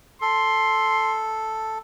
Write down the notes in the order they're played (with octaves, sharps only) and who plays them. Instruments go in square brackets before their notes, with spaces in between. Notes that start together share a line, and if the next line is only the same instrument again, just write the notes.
[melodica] A4 [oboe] C6